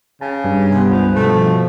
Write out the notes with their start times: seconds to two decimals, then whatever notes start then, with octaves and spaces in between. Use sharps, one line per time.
0.21 C#3 G5 A5
0.44 G2
0.70 C3 B3
0.90 C#2 F3
1.15 B2 F3 A3